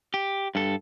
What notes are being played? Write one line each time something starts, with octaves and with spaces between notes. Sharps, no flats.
G4
G2 A4